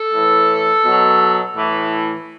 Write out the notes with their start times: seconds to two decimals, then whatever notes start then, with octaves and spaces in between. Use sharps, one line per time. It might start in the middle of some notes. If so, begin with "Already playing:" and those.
Already playing: A4
0.14 A2 E3
0.84 B2 F#3
1.56 A2 E3